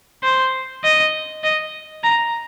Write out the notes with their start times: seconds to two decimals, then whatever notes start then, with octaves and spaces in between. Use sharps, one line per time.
0.23 C5
0.84 D#5
1.44 D#5
2.04 A#5